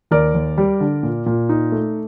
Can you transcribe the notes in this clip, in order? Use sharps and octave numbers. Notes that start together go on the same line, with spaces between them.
D#2 A#4 D5
D#2
G3
D3
A#2
A#2
D#4
A3